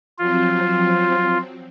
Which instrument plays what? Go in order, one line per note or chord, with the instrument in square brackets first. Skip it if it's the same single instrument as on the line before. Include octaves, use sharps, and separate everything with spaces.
[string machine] F3 F#3 C4 [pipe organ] F4